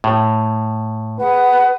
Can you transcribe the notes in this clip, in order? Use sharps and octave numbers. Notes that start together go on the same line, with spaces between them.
A2
G#4 B4 F#5